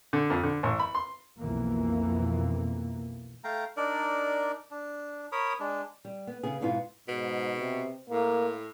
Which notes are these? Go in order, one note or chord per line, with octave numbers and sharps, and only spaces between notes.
D3
F2
D3
A1
B5
C6
B1 F2 E3 A#3
A3 F5 G5 A#5
D4 D#4 A#4 D5
D4
A#4 C#5 B5 D#6
G#3 D4
G3
B3
C#3 B3 G#4
G#2 B2 B3 E4 F4
G#2 B2
C3
A2 A#3